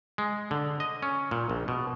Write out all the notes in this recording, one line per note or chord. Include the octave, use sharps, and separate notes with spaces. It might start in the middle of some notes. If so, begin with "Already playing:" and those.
G#3
D3
D#5
C#4
A#2
A#1
B2